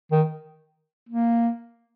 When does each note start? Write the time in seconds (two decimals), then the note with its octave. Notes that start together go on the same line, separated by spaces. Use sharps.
0.11 D#3
1.09 A#3